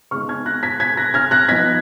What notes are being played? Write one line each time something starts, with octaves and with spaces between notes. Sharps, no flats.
C#3 G#3 B3 D#4 C#6 F6
F6 G#6
F#6 A#6
G#6 B6
G#6 B6
F#6 A#6
F6 G#6
F#6 A#6
F3 B3 D#4 G#6 B6